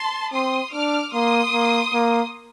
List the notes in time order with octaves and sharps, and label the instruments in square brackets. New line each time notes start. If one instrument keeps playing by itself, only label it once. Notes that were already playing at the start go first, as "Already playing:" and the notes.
Already playing: [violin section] A5 C6
[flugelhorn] C4 [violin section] C6 D#6
[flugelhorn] D4 [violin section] D6 F6
[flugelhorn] A#3 [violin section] C6 D#6
[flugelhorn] A#3
A#3